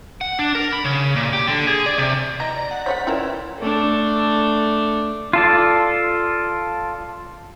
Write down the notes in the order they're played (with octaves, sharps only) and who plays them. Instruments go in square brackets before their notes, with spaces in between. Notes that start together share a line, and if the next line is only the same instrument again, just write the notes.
[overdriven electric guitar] F#5
D4
A#4
B5
C#3
A#2
G4
D3
G#4
D5
C3
[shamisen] E3 [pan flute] D#5 [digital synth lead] A#5
[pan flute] D5
[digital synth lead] F#5
[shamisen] C#3 F4 F#5 [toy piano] C5 C#5 [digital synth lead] B6
[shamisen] C4 F4 A#4 [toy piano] C#4 B4 [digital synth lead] E4
[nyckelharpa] A3 D4
[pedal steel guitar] F4 A4 D5